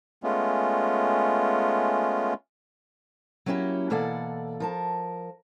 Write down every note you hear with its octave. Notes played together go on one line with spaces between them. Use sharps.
G#3 A3 B3 C#4 F4
F#3 A#3 C#4 E4 F#4 G4
B2 E3 A#3 A4 D5 F#5
F3 A#4 A5